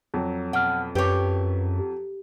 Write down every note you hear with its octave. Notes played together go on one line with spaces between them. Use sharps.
F2 F#3
B2 F#5 F6
F#2 G4 B4 C#5
G4